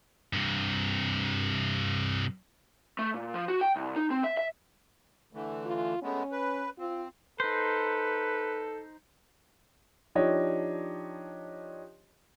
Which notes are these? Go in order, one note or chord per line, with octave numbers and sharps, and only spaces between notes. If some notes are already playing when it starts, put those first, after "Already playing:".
G2 C3
A3
A#2
F3
F#4
G5
C2
D#4
C4
E5
E5
D3 E3 A3
F4
G#3 A3 B3 C#4
B4
C4 F4
D#4 A4 B4 C5
F3 D4 D#4 G4 C#5 D#5